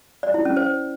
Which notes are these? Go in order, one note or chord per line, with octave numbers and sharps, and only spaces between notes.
D5
E4
C#4
C5